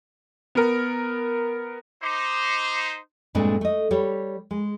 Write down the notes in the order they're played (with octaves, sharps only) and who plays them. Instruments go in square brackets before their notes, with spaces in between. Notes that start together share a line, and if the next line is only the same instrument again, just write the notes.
[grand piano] B3 A#4
[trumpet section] D#4 C5 [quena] D6
[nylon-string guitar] G2 A#2 G#3 A3 C4 D4
A3 D#5
G3 G4 C#5
G#3